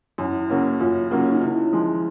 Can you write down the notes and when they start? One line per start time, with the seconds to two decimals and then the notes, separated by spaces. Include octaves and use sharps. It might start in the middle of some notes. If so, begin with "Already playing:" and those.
0.18 F#2 E4
0.49 C#3 F#3 A#3 C#4
0.80 F#2 F4
1.11 C#3 F#3 A#3 C#4 F4
1.31 D#4
1.42 C#3 E4
1.73 F3 G#3